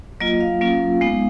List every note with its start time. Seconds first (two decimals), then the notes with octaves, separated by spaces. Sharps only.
0.20 F#3 A#3 F4 D#5
0.41 F5
0.61 F#3 A#3 C#4 F4
1.01 G#3 B3 D#4